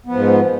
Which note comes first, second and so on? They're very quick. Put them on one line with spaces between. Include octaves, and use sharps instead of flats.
B3 F3 G#2